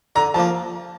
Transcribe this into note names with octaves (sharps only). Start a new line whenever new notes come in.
D3 A#5
F3 A#3 A5